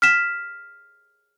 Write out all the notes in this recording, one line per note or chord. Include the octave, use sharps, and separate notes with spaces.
F6 B6 E7